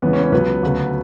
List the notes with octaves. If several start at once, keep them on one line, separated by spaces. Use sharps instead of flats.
E2 C#3 E3 G#3 B3
C#4
C#4
C#2 C#3 F#3 B3
D2 C#3 F#3